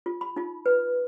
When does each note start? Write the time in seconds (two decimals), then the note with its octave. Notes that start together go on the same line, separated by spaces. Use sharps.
0.06 F4
0.21 B5
0.36 D#4 F4
0.66 B4